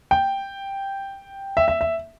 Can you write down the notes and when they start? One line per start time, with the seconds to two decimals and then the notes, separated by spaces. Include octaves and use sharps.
0.11 G5
1.57 E5
1.68 E5
1.81 E5